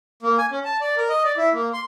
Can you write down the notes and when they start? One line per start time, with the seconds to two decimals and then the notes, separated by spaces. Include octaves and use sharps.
0.23 A#3
0.38 G#5
0.51 C#4
0.65 A5
0.81 D5
0.97 A#4
1.09 D#5
1.24 D5
1.37 E4
1.53 A#3
1.73 C6